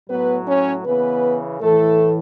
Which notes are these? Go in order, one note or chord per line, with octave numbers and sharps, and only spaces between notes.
A2 F#3 B3 B4
C#4 C#5
C#3 E3 B3 B4
A2 E3 A3 A4